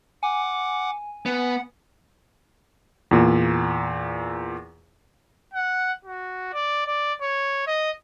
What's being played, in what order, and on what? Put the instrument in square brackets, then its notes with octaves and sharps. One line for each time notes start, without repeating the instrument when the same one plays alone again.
[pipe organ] F#5 D6 [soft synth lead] G#5
[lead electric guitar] B3 [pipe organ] F#5
[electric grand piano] E2 A#2
[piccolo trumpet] F#5
F#4
D5
D5
C#5
D#5